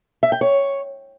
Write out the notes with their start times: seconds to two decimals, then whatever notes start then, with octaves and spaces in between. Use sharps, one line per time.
0.23 E5
0.32 G5
0.41 C#5